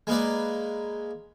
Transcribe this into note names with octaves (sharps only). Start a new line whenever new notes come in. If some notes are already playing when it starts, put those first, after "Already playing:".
G#3 A#3 B4 D5